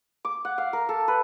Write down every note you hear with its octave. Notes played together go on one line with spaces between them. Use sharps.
D6
F#5
F5
A#4
A4
B4